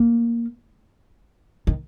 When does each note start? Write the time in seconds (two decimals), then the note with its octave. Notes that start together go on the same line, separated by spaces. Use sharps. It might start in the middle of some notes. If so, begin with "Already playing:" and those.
Already playing: A#3
1.67 D#3